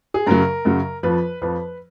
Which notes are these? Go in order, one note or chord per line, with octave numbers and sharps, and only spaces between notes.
G#4
F#2 C#3 F#3 A#4
F#2 C#3 F#3
F2 F3 B4
F2 F3 B4